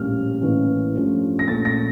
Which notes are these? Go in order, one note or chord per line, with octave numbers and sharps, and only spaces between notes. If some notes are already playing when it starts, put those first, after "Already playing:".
Already playing: A#1 A2 G3 A#3 C#4 F6
A1 A2 E3 A#3 C#4
G2 F3 A3 C#4
A#6
A#1 A#2 A3 C#4 A6
A#6